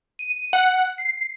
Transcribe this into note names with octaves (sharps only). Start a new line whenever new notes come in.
D#7
F#5
C7